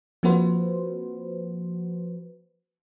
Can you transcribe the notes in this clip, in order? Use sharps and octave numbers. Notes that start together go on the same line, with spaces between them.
F3 A#3 C4 F#4 B4 C5